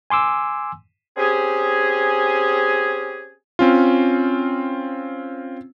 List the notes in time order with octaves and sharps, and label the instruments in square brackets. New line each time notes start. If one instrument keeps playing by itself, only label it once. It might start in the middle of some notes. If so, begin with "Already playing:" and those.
[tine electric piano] G#5 C6 D6 E6
[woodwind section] C4 C#4 G4 G#4
[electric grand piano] C4 C#4 F4